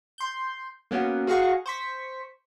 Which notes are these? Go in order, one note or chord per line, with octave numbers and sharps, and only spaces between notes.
C6 G6
A#3 B3 C#4 F#4
F#4 G#4 F5 F#5 A#5 C#6
C5 C#6 B6